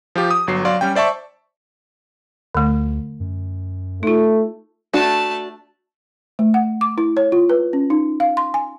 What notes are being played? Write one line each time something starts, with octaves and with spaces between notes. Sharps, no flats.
F3 F4 G4
D#6
G1 F#3 C7
F#3 D5 F5 C6
G3 C#4 G5
C5 D5 E5 A5 C#6
D2 D3 A3
F#2
A3 D#4 F4
A3 D4 F#4 A5
A3
F#5
D6
E4
C#5
F4
B4
C#4
D#4
F5
C6
G#5